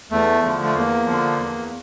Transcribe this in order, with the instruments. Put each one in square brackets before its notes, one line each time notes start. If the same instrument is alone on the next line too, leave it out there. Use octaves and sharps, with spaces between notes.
[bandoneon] E2 A3
D3 F3
A3
E2 A#3
D3 F3
E2